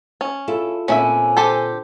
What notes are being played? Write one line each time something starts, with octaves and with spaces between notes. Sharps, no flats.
C#4
E4 F4 A4
A#2 D3 C4 C#4 E4 E5 G#5
G4 A4 C5